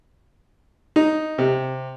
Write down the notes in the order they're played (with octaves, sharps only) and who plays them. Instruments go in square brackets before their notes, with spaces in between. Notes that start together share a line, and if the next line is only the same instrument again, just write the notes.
[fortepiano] D#4
C3